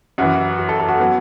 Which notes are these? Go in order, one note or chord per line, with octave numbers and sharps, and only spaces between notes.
F#2 E3 F#4
F#4
A4
A4
F#4
F#3 B3